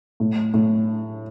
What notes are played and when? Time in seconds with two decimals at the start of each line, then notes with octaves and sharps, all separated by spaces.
0.20 A2
0.54 A2